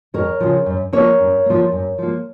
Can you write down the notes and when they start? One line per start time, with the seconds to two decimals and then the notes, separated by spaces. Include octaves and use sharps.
0.14 F2 A#4 C#5
0.40 C#3 F3
0.66 F#2
0.93 F3 A#3 A#4 C#5
1.20 F#2
1.46 F3 A#3
1.72 F#2
1.98 F3 A#3